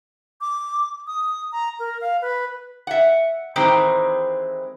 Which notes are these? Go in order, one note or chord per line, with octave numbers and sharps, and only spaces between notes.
D6
D#6
A#5
A#4
F5
B4
E5 F#5
D#3 E3 G#3 C4 D#4 G4